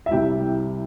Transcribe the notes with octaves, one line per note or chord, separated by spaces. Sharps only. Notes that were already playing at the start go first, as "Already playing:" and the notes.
E5
C2 C3 G3 E4 G5